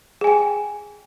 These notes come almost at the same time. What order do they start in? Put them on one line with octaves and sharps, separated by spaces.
G#4 G#5 G5